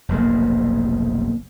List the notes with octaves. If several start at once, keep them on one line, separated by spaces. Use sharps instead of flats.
F1 B1 G#2 A#3